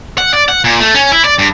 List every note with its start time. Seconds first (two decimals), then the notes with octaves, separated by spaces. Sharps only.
0.18 F#5
0.33 D5
0.49 F#5
0.64 A#2
0.80 A3
0.95 C#4
1.12 E4
1.25 D5
1.38 G2